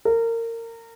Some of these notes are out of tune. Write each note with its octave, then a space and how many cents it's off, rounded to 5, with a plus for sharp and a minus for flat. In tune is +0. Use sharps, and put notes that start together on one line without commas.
A#4 -25